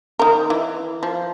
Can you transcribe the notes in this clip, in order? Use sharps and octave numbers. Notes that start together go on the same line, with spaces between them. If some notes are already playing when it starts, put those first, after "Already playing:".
D#3 A#4
E3
F3